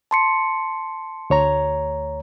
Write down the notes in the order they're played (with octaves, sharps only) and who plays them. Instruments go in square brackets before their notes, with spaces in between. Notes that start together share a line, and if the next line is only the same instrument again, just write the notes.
[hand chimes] A5 C6 C#7
[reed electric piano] D2 C#5 A#5